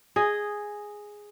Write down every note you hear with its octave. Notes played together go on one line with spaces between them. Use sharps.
G#4 D#5